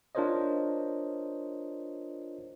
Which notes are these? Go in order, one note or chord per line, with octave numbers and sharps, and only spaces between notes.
D4 F4 A#4 C5 C#5 D#5